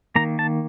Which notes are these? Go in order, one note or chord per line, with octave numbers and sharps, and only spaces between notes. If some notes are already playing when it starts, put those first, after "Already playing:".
D#3 A#3 A#5
A5